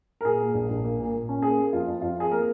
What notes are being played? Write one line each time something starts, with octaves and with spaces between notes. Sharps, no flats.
A#4
A#2 G#4
A#3
A#1
A#1
A#3
A#2
A#2
C#4
A#3 G#4
A#3
F2 F4
F2
F2 F4
F2 G#4
A#3 A#4